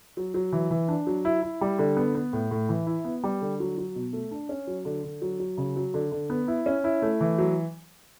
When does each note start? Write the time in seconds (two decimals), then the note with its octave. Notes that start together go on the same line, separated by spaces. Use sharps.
0.17 F#3
0.34 F#3
0.52 E3
0.71 E3
0.88 D4
1.07 F#3
1.25 E4
1.42 E4
1.61 G3
1.78 D3
1.97 B3
2.15 B3
2.33 A2
2.51 A2
2.69 E3
2.87 E4
3.05 B3
3.24 G3
3.41 D3
3.60 F#3
3.78 F#3
3.95 B2
4.13 A3
4.31 D4
4.49 C#4
4.67 F#3
4.85 D3
5.04 D3
5.22 F#3
5.39 F#3
5.57 C#3
5.76 F#3
5.94 D3
6.12 D3
6.30 B3
6.48 E4
6.66 C#4
6.84 E4
7.02 A3
7.20 E3
7.38 F#3